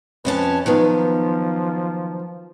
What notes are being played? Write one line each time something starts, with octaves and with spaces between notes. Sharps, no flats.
F2 C#4 B4 A5
D#3 F3 F#3 B3